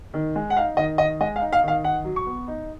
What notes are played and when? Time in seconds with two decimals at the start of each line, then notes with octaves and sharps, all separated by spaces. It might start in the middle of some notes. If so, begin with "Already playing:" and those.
0.14 D#3
0.36 G#3
0.50 F#5
0.57 D#4 F5
0.77 D#3 D#5
0.98 D#3 D#5
1.20 G#3 D#5
1.36 F5
1.41 D#4
1.53 F5
1.63 D#3 F5
1.84 D#3 F#5
2.05 F#3
2.16 C#6
2.26 B3
2.48 D#4